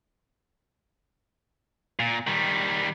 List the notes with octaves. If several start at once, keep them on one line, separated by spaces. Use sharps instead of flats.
A#2
D#3 G3